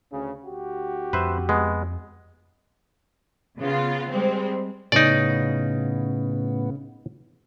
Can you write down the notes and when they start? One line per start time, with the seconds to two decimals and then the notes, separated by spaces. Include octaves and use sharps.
0.12 D2 C#3
0.46 D2 F#4 G4
1.13 F2 B4 C5 E5
1.49 G#3 B3
3.59 C#3 B3 F4
4.10 G3 G#3 C4
4.92 A2 C#3 B3 D#4 D5